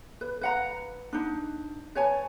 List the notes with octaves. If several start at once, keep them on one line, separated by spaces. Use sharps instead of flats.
B4
B4 F#5 A#5
D4 D#4
B4 C#5 G#5 A5